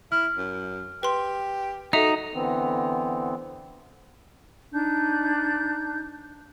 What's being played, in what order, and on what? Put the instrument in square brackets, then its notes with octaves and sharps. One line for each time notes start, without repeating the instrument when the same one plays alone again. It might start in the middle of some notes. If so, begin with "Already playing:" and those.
[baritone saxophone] E4 [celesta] F6
[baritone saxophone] F#2
[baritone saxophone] G4 [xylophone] B4 C6
[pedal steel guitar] D#4 [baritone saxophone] F#4 [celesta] A4 F7 [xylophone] E5
[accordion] D3 E3 B3 C4
[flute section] D4 D#4 G6